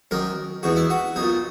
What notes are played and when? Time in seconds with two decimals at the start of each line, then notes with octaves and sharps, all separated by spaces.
0.11 F#2 D#3 A#4
0.63 E2 B2 F#4
0.76 E4
0.90 F#4
1.16 B1 A#2 D#4